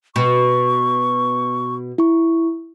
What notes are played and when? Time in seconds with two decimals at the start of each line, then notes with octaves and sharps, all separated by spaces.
0.16 B2 C#6
1.98 E4 C#6